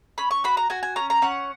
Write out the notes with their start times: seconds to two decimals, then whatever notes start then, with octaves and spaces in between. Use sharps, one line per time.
0.18 C#4 B5
0.31 C#6
0.44 F#4 B5
0.57 A#5
0.70 F#4 G#5
0.83 G#5
0.96 C#4 A#5
1.10 A#5
1.22 C#4 F#5